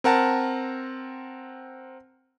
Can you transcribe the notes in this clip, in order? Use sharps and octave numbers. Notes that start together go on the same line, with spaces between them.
C4 A#4 F#5 A5